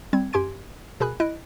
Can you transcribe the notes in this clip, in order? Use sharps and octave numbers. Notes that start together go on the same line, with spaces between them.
G3 C4 G#6
F#2 G4 G#5 C6 G#6 D7
B2 G#4 A#4 G#5 B5 F#6
E4 D#5 F#6 D7